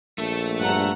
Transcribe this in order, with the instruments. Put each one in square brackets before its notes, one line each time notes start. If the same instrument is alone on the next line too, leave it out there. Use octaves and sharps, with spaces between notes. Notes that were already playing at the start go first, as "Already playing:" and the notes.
[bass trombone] A#1 [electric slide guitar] A3 A4
[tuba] G2 [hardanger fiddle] F#5 A#5